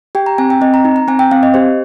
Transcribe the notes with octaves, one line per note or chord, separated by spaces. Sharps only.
G4 G5
A#5
C4 G#5
G5
C4 D#5
A#5
D#4
A#5
C4 G#5
G5
C4 F5
D#5
G4 C5